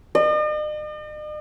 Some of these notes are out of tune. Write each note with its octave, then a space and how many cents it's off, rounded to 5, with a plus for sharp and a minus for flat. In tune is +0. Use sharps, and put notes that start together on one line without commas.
D#5 -45